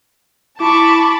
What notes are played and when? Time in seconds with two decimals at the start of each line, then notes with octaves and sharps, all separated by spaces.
0.61 E4 A5 B5 C#6 D6